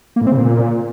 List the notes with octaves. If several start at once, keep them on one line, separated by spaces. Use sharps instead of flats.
A#3
A2
C4
C#3
A#2